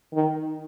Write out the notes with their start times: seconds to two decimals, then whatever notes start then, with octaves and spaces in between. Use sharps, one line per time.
0.13 D#3